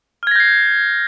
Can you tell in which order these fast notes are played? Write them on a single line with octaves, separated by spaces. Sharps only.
F6 G#6 A#6 G6 C7